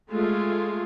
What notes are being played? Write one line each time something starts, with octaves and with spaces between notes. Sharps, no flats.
G#3 A3 F4